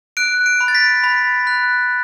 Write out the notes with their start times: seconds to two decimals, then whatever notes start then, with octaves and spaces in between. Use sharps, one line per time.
0.17 F#6 D7
0.46 D7
0.61 B5
0.68 A6
0.75 B6
1.04 B5
1.47 F#6